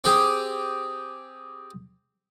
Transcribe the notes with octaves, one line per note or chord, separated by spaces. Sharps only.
C4 G4 G#4